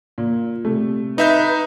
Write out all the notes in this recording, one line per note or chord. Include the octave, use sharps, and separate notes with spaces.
A#2
C3 A3
D#4 B4 E5 G6